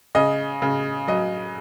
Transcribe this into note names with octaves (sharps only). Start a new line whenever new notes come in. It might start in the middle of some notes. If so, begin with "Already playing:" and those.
C#3 D#5
C#3
F#3 D#5